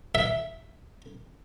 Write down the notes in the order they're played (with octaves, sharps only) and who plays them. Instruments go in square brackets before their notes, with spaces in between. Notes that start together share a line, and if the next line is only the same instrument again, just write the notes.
[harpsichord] E5